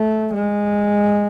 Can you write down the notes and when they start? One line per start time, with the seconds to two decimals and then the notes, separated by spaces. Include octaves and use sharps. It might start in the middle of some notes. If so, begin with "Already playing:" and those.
Already playing: A3
0.34 G#3